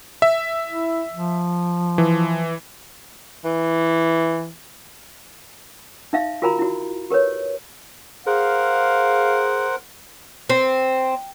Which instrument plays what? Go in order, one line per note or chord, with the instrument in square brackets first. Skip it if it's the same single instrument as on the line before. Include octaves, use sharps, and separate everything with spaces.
[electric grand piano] E5
[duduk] E4
F3
[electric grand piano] E3
[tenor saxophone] E3
[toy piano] D#4 E5 F5
F4 F#4 A#4 G#5 A#5 B5
E4 F#4
G4 A#4 B4 C#5
[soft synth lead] G#4 [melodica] A#4 C5 F#5 [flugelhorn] F5
[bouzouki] C4